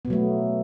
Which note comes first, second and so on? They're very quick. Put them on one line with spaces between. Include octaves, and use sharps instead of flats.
B3 B2 F#3 A3